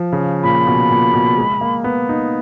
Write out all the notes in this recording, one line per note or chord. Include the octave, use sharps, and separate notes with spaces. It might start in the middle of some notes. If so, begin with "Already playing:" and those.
Already playing: F3
C#3
A#2 B5
B2
A#2
B2
G#3
A#3
B3
D#4